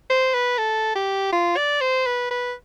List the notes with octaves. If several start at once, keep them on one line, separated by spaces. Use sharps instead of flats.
C5
B4
A4
G4
F4
D5
C5
B4
B4